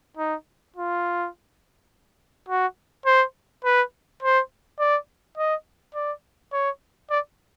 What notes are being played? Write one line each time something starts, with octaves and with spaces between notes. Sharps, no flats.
D#4
F4
F#4
C5
B4
C5
D5
D#5
D5
C#5
D5